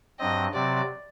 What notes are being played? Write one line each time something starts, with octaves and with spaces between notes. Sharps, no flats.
G2 F#3 C4 D#5
C3 F#3 C4 D5